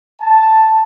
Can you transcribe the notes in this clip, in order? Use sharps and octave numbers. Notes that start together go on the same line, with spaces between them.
A5